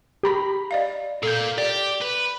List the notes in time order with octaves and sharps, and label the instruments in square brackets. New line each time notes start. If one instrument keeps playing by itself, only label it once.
[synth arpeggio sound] G4 A#5 B5
[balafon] D5 D#5 F5
[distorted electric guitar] A#2 A#3 [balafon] A4 [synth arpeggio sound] G6 C7
[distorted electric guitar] G4 [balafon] D5
[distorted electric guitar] B4